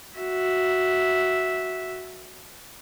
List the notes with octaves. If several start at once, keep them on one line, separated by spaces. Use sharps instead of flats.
F#4 E5